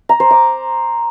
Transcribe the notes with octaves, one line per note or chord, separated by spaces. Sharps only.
A#5
C5
D6